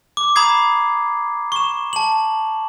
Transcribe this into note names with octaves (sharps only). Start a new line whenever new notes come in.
D6
A#5 B5 D#6 G#6 C7
C#6 E7
A5 F#7